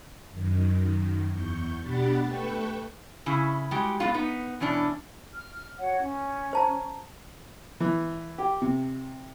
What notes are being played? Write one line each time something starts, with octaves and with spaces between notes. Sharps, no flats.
F#2 D#3
E2 C#6 G6
B2 D4 G4 F#5 B5 A6
A3 A4 B4 G5 C#6
C#3 C#4 E4
G3 G#3 F#4 G4
A2 G#3 B3 C#4 F4
B3 D#4
B2 E3 C#4 D4
F6
F#4 C#5 F#5
C#4
C5 A5 A#5
E3
G4
C3